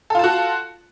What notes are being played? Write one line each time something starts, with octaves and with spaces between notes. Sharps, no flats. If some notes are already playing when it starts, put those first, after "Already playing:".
F4 F#4 A4 A5